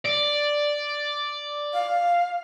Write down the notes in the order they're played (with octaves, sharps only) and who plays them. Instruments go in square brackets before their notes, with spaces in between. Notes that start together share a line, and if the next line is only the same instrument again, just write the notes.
[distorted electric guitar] D5
[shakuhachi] F5